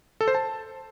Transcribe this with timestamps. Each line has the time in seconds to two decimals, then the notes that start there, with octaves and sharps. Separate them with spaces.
0.21 A4
0.28 C5
0.35 A5